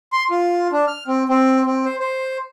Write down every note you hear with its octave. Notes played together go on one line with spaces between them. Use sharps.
C6
F4
D4
F6
C4
C4
C4
C5
C5